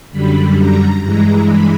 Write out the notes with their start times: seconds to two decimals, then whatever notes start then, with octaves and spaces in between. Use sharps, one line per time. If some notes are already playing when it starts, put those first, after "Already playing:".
0.12 F#2 D3 G3 B5
0.57 A#5
1.01 G2 E3 G#3 A#5
1.45 B5